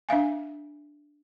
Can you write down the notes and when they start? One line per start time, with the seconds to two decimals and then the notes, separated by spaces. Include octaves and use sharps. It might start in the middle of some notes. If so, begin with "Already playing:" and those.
0.09 D4 E5 F5 G#5